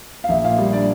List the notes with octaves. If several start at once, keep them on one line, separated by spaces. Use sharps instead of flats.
F5
A#1 E5
A#2 F5
G3
D4 D5